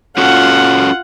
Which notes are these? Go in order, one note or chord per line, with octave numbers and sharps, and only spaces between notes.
C#4 F4 F#4 A4 F#5